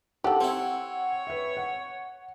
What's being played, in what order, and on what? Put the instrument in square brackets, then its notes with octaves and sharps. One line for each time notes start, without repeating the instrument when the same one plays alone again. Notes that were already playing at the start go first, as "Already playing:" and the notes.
[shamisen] G4 A4 [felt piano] F#5
[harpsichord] C4 E4 [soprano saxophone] C#5
[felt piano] B4 E5
F#5